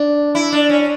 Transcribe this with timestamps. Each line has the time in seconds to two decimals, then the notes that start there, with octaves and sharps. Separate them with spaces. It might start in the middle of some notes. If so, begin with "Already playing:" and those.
Already playing: D4
0.35 E4
0.52 D4
0.69 C#4